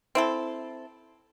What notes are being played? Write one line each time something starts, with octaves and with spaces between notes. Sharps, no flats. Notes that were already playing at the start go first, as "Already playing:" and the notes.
C4 E4 A4